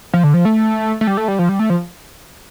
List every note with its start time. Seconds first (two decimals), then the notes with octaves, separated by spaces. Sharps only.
0.14 F3
0.24 D3
0.34 F3
0.45 A3
1.01 A3
1.07 G3
1.17 A3
1.28 G3
1.39 F3
1.49 G3
1.59 A3
1.70 F3